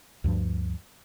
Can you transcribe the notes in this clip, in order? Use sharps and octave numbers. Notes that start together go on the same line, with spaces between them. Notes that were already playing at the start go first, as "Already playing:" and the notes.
D2 G2 F3